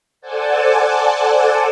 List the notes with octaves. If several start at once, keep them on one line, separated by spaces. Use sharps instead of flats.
A4 C5 D5 F#5 G#5 A5